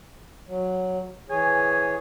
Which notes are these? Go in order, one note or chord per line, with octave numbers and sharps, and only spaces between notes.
F#3
E3 G#4 C#5 G#5